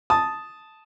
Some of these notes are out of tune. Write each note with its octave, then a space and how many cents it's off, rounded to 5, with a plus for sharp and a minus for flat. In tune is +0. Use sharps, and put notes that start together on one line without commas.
A5 -5 D#6 +0